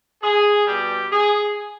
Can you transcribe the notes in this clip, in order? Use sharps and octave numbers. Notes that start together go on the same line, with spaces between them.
G#4
B2 G3 G4
G#4